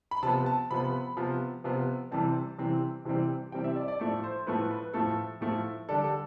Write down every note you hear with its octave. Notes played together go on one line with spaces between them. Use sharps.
B5
C3 F3 B3 A5
A5
C3 F3 B3 B5
C3 F3 B3
C3 F3 B3
C3 E3 G3 C4 A5
C3 E3 G3 C4
C3 E3 G3 C4
C3 E3 G3 C4 G5
E5
D5
D5
A2 F3 A3 E4 D5
C5
A2 F3 A3 E4 B4
B4
A2 F3 A3 E4 A4
A2 F3 A3 E4
D3 G3 D4 A4
A4